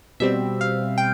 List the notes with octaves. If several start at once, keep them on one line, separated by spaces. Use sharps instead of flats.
B2 G3 C4 E5
F5
G5